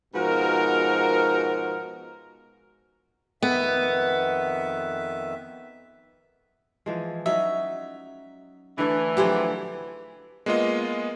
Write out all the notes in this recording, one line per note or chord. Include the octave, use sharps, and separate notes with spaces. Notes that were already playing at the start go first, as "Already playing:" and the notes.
G#2 B2 F3 F#4 A#4
F2 D#3 B3 E5
E3 F3 G#3
F#3 C#4 D#4 E5
D3 E3 A3
D3 F3 F#3 G4 G#4 C5
G#3 A#3 B3 F4 D#5